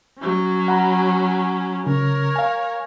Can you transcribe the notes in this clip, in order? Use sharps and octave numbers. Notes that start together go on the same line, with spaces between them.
F#3 C#4
F#5 A#5 B5
C#3 A#4 C#5
F5 G#5